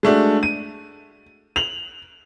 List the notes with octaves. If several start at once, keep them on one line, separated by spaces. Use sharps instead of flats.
G#3 A3 D4 F#4
D#7
F7 F#7